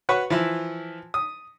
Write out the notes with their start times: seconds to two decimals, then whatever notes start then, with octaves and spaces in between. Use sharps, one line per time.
0.09 F#4 B4 C#5 F#5
0.30 E3 F3 E4
1.14 D#6